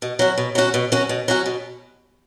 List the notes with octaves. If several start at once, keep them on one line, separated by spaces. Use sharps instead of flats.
B2
F#3 C#4 F#4
B2
F#3 C#4 F#4
B2
F#3 C#4 F#4
B2
F#3 C#4 F#4
B2